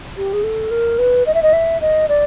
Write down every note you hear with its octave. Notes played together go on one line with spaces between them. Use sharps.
G4
G#4
A4
A#4
B4
D#5
E5
D#5
E5
D#5
D5